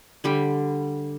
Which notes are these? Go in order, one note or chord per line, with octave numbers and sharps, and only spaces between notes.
D3 G3 B5